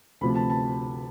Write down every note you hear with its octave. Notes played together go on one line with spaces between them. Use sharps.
D2 C3 F3 A3 C4 B5
A5
A5